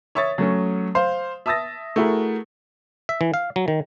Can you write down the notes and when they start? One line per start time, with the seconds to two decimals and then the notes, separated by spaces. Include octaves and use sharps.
0.15 C#5 E5 C#6 D#6 A6
0.38 F#3 A3 C#4
0.95 C5 F5 C6
1.46 E5 A5 D#6 E6 A6 A#6
1.96 A3 E4 F#4 G#4 A#4
3.09 E5
3.21 E3
3.34 F5
3.56 F#3
3.68 D#3